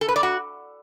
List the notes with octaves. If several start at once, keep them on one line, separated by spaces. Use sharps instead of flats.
A4
B4
D5
F#4